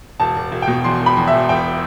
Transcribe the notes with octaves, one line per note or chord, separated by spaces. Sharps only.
E1 A5
E1
E1
G5
B2
E2 C6
E1
B5
E2
E5
E1
E1 G5